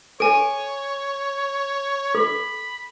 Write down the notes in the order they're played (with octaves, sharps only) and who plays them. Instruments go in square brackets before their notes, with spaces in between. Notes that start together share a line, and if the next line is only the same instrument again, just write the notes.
[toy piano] A4 [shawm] C#5 [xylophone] G#5 D7
[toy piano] A4 [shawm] B5